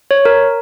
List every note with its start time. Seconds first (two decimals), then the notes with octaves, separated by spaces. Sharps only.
0.11 C#5
0.25 A#4